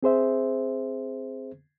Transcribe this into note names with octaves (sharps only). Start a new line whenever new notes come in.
C4 G#4 C5 E5